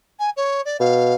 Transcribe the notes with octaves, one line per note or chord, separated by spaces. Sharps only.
G#5
C#5
D5
B2 F5